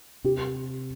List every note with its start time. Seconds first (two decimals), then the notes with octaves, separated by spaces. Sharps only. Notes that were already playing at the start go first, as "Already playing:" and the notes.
0.24 C3 G4